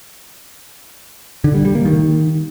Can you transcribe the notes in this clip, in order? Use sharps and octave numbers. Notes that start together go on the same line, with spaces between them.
D3
G3
G3
A#3
D#3